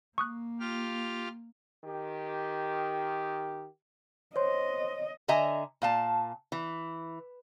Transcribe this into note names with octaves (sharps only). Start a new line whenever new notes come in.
A#3 C#6 D#6 F#6
F4 G4 F6
D#3 G4
C5 C#5 D#5 C6
D3 D#5 E5 G#5 A#5
A#2 F5 A5
E3